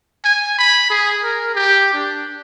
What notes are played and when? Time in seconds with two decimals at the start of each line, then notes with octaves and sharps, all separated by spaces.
0.25 G#5
0.59 B5
0.90 G#4
1.24 A#4
1.55 G4
1.94 D4